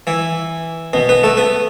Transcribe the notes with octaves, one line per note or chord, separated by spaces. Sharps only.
E3 E4
B2 B3
B3 B4
A3 A4
B3 B4